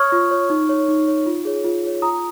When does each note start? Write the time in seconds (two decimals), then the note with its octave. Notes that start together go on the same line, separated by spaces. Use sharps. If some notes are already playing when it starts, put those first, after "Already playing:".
Already playing: C#5 C#6 D#6 F6 G#6
0.12 F4
0.31 C#5
0.50 D#4
0.69 C#5
0.88 D#4
1.08 C#5
1.26 F4
1.45 G#4 C#5
1.64 F4
1.83 G#4 C#5
2.02 F4 A#5 D#6